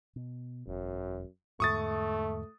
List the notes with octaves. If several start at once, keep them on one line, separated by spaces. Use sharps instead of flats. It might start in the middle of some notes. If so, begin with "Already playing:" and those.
B2
E1 F#2
E2 G#2 D3 A3 C#6 D#6 A6